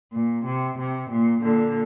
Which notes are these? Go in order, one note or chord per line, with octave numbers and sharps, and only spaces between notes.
A#2
C3
C3
A#2
A#2 D3